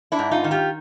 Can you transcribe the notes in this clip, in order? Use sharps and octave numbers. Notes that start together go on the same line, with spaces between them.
D4 E4
G#2
D#4 F4
D#3
F4 G4